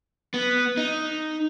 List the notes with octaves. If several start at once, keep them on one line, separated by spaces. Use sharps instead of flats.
B3
D#4